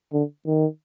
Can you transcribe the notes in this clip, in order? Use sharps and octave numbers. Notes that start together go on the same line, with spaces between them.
D3
D#3